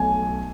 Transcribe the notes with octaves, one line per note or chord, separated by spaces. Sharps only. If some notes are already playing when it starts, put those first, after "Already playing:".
Already playing: B1 B2 A3 G#5